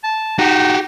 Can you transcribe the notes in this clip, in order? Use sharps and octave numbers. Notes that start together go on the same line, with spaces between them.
A5
D#4 F#4 G4